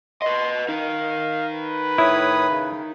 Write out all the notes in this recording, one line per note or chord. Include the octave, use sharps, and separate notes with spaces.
B4 D#5 C6
D#4 A#4 F5
B4
A2 E4 C#5 D#6
C#3